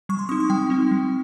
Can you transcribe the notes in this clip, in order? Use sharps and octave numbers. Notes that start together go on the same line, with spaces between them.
G3 C#6
C6
C4 D#4 D#6
C#6
G3 G5
C4 D#4
G3